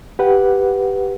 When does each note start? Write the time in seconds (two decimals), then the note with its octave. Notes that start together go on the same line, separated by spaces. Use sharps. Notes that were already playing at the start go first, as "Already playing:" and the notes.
0.19 G4 B4 F#5